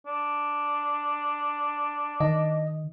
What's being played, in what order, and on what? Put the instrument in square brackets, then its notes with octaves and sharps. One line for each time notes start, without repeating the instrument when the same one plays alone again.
[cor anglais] D4
[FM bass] D#3 [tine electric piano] D#5